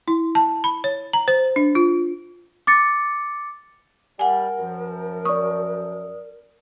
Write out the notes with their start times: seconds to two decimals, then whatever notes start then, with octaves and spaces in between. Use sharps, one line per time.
0.08 E4
0.35 A5
0.64 B5
0.84 C#5
1.13 A#5
1.28 C5
1.56 D4
1.75 F4
2.67 D6 A6 C#7
4.19 G3 A#4 F#5 G#5
4.59 F#2 F3
5.25 D5 C#6 D#6